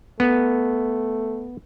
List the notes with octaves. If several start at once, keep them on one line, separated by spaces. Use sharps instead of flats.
A3 B3